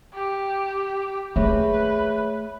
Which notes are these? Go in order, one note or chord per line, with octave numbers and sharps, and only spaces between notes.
G4
A3 G#4 B4 C#5 E5